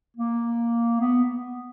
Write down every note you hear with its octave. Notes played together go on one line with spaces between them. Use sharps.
A#3
B3